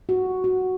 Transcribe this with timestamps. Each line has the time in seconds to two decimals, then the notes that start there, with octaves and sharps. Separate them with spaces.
0.09 F#4
0.44 F#4